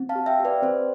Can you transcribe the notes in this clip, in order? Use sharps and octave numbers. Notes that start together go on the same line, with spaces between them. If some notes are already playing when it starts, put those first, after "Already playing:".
Already playing: C4
F5 A5
G4
E5 G5
G4
B4 D5
C4 C5